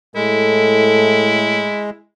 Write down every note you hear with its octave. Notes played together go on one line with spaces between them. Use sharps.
A2 G#3 E4 A4